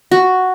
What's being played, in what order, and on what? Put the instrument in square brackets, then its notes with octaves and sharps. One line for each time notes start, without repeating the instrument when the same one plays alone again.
[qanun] F#4